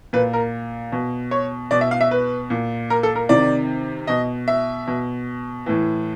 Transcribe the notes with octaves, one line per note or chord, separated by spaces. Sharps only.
A#2 B4
A#4
B2
C#5
B2 D5
E5
F5
E5
B4
A#2
A#4
A4
A#4
C3 D#3 D5
B2 D#5
E5
B2
A2 E3